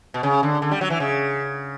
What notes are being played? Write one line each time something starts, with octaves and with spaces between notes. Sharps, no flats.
B2
C#3
D3
D3
G3
F#3
E3
C#3